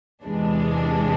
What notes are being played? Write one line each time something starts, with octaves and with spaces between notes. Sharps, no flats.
E2 C3 E3 G#3 D4